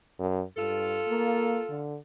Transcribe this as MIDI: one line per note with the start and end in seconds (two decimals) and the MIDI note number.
0.19 0.43 42
0.57 1.02 43
0.57 1.88 65
0.57 1.88 69
1.08 1.59 58
1.70 1.97 50